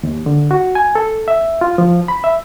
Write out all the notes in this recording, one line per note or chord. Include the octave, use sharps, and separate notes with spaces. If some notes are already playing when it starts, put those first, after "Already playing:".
D#2
D3
F#4
G#5
A4
E5
F4
F3
B5
E5